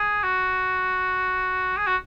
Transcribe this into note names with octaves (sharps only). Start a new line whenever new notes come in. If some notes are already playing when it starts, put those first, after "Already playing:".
Already playing: G#4
F#4
G#4
F#4